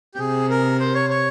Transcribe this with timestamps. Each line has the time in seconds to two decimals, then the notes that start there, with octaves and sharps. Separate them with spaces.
0.15 G4
0.19 C3 G#4
0.50 A#4
0.80 C5
0.95 C#5
1.10 C#5